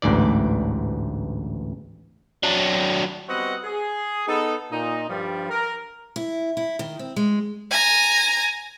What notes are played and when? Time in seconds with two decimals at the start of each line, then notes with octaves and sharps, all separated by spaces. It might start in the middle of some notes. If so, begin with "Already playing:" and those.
0.02 A1 D2 G#2 E3 D5
2.43 F#3 D4
3.29 G3 B3 C4 F#4 D#5 F#5
3.64 G#4
4.28 B3 D#4 A4
4.71 A#2 D#4
5.09 G2 F3 G3
5.50 A#4
6.16 E4
6.57 E4
6.79 D#3
6.99 C4
7.16 G#3
7.71 G#5 A#5